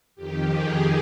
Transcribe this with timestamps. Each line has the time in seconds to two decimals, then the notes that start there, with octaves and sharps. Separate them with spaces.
0.16 F2 D#3 G4
0.49 G#4